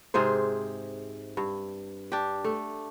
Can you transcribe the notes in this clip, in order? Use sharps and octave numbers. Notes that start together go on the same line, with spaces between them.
G#2 C3 G#4 C5
G2
D4 G4
A3